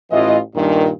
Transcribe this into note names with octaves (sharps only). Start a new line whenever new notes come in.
A1 E3 F4 D#5
G2 A#2 D#3